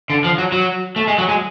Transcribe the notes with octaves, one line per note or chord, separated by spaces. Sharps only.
D3
F3
F#3
F#3
A3
G#3
F#3
G#3